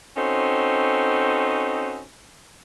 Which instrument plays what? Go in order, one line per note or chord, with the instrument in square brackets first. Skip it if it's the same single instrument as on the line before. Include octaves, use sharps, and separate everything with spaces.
[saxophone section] C4 C#4 D#4 F#4 A4 C5